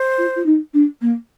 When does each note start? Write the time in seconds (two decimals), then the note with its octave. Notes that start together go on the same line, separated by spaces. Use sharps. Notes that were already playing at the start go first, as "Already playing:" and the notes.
Already playing: C5
0.18 F4
0.36 F4
0.46 D#4
0.73 D4
1.01 A#3